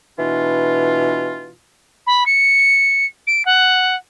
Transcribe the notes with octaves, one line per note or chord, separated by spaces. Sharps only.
B2 E3 D4 F4
B5
C#7
D7
F#5